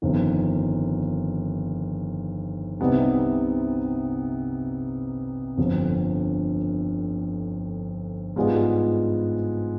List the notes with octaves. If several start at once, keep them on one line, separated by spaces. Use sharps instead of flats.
G1 F2 D#3
C2 C3 G3 B3 D#4
G1 F2 D3
G#2 G3 B3 F4 G#4